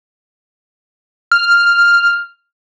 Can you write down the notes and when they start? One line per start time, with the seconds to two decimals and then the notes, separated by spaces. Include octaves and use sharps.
1.31 F6